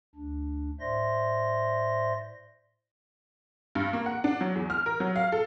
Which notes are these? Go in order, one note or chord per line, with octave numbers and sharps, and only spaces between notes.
D2 D4
A2 C5 D5 E5 C6 A#6
G2
A#3
F#5
D4
F#3
E2
F6
A#4
F#3
F5
A4